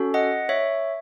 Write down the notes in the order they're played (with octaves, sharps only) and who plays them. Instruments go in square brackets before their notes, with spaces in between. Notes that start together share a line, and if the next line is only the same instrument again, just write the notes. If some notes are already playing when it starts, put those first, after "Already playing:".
Already playing: [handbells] C#4 F#4 A4
D#5 F#5
C#5 E5